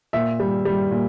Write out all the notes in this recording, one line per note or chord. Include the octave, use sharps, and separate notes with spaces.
A#2 E5
G3
G3
A#2